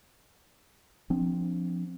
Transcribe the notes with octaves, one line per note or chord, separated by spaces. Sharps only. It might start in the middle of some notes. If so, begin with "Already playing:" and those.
F3 C4 D4